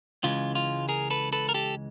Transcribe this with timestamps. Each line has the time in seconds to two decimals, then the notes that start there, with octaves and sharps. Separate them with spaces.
0.24 C#2 C#3 E3 G#3 F4
0.55 F4
0.89 G#4 A#4
1.10 A4 B4
1.33 A4 B4
1.49 A#4
1.54 G4 A4